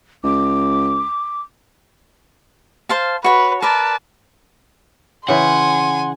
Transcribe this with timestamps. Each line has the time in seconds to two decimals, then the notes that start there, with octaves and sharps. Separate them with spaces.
0.24 C#2 D6
2.89 C5 F5 A5
3.24 F#4 B4 C#5
3.62 A#4 B4 D5 A5
5.28 C#3 E3 F#5 G#5 C6